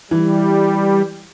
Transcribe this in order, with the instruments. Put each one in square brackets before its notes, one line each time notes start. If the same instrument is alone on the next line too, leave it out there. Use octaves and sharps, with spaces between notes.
[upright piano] E3 [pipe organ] G3